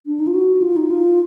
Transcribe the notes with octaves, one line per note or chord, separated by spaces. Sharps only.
D4
D#4
F4
F#4
F4
D#4
F4